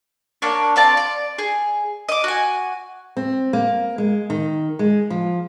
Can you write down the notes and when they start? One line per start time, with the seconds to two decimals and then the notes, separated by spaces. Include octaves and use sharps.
0.42 A#3 D4 C#5
0.76 C4 F4 D5 A5
0.97 D5
1.38 G#4
2.09 D#5 D6
2.24 F#4 G#5
3.17 C4
3.53 A#3
3.98 G#3
4.30 D#3
4.79 G#3
5.10 F3